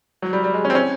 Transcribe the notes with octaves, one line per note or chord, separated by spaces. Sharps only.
F#3
G3
G3
G#3
C#4
C4
C#4